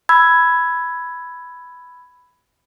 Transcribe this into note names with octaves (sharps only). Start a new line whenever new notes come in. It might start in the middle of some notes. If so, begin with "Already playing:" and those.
B5 E6 G#6